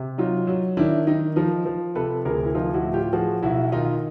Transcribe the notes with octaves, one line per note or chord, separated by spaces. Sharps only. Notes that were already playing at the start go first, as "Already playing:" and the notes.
Already playing: C3
F#3 D#4 F4
F#3
D#3 D4 E4
D#3 D#4
F3 D#4
F3
C3 A4 B4
D2 G#4 A#4
E4
F3 D#4 F4
E4 F#4
A2
F4 G4
F3 F#4 G#4
B1 E4 F#4
D#3 D#4 F4